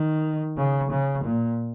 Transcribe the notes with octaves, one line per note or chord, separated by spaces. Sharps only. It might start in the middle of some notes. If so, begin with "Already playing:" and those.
Already playing: D#3
C#3
C#3
A#2